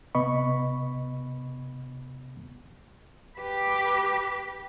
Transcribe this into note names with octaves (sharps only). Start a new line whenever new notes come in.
C3 B3 D#5 B5 C#6
G4 B4